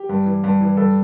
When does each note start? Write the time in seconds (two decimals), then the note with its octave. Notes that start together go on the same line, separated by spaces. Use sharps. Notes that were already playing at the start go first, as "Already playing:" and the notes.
Already playing: G4
0.09 G2
0.26 E3
0.44 G2
0.61 E3
0.77 G2 A4